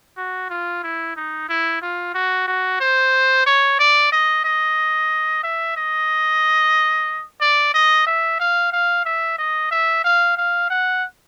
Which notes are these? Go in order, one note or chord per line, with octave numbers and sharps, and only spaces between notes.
F#4
F4
E4
D#4
E4
F4
F#4
F#4
C5
C#5
D5
D#5
D#5
E5
D#5
D5
D#5
E5
F5
F5
E5
D#5
E5
F5
F5
F#5